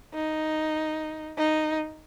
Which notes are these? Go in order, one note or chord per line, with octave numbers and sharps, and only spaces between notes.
D#4
D#4